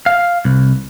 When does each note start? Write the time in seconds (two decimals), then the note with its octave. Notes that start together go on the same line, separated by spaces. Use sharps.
0.06 F5
0.45 C2